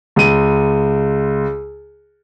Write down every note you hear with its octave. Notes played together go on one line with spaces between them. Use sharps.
C#2 D#7